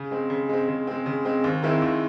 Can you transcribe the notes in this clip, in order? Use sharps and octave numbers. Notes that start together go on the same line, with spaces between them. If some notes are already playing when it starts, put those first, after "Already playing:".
Already playing: C#3
G#3 C4
C#3
G#3 C4
C#3
G#3 C4
C#3
G#3 C4
D#2
D#3 G#3 C4 E4
D#2